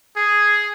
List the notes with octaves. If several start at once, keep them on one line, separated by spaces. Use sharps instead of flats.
G#4